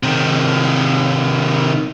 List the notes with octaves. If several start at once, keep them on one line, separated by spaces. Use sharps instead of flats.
C3 D#3